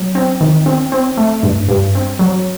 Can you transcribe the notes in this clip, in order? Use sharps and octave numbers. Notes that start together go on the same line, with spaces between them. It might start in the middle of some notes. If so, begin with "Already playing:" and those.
Already playing: F#3
C4
D#3
C4
C4
A3
G2
G2
C4
F#3